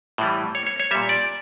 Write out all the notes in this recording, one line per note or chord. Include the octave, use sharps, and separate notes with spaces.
A2 E3 G3
C#5
C#5
C#5
A#2 G3 E5
D5